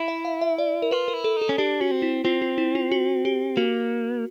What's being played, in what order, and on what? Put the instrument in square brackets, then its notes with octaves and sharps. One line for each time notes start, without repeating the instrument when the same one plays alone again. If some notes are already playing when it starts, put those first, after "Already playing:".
Already playing: [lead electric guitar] E4
[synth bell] E5
F5
E5
D5
A#4
[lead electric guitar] F4 [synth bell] B4
[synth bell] A#4
[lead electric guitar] E4
[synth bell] A4
[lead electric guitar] D#4
[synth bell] A4
[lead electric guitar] C#4
[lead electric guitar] D4 [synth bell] G4
[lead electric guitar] C#4 [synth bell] F#4
[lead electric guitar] C4
[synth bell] E4
[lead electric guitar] C4 [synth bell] F4
[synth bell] F4
E4
F4
F#4
G4
[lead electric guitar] A#3 [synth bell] F#4